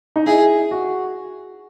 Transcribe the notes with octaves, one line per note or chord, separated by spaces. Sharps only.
D#4
E4 G#4
F#4